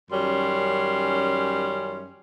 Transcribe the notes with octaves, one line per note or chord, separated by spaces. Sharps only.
F#2 D#3 G3 C#4 C6